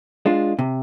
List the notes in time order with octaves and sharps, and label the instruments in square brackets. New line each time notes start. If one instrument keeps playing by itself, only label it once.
[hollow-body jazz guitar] G#3 D4 F4
C3